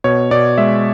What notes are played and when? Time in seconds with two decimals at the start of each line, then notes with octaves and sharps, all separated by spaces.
0.04 B2 C#5
0.31 B2 D5
0.58 G#3 E5